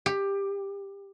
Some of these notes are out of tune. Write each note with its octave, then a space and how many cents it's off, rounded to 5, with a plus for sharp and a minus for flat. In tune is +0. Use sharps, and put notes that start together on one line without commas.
G4 +15